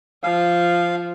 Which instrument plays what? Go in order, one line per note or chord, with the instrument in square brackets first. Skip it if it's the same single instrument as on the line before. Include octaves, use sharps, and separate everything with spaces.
[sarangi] F3 [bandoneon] F5